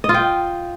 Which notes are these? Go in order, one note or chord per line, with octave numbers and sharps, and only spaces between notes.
D#5
F4
G5